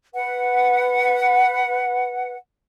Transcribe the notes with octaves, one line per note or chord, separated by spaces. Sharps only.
B4 F#5